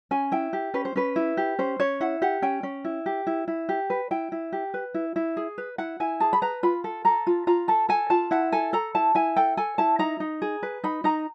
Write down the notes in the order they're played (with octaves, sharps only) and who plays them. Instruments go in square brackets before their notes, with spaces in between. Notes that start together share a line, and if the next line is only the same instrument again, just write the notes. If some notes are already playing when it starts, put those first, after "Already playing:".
[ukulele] C#4 G#5
E4 G5
G4
C#4 B4
C5
C#4 B4
E4
G4
C#4 C5
C#4 C#5
E4 F#5
G4 F#5
C#4 G5
C#4
E4
G4
E4
E4
G4
B4
E4 G5
E4
G4
B4
E4
E4
G#4
B4
E4 F#5
E4 G#5
G#4 A5
B5
B4 A#5
F4 B5
A4
A4 A#5
F4
F4 A#5
A4 A5
A4 G#5
F4 A5
E4 F#5
A4 G#5
A4 A#5
E4 A5
E4 G#5
A4 G5
A4 G#5
E4 A5
D#4 A#5
D#4
G#4
B4
D#4 B5
D#4 A#5